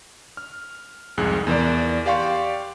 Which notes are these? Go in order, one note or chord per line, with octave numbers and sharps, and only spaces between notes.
F6
C2 F2 G#2 G#4 F#6
E2 A#4 D5
G4 D5 F5 G5 C6 C#6